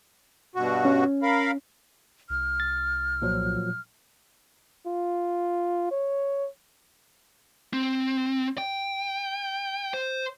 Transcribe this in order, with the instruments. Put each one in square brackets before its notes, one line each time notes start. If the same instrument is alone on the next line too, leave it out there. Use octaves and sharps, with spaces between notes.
[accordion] G2 B2 F#4
[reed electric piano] C#4
[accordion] A#4 F5 B5
[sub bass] C2 [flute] F6
[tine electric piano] A6
A#2 F3 F#3
[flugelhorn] F4
C#5
[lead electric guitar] C4
G5
C5